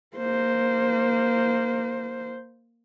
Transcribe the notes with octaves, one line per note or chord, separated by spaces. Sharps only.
A#3 C5